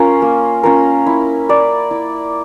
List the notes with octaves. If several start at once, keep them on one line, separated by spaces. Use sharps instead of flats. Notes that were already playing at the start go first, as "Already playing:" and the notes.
Already playing: C#4 F4 A#4
A#3
C#4 F4 A#4
E4
A#4 D5
E4